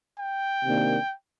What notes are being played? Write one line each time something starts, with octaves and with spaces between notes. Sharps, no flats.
G5
C3 D#3 A#3 D4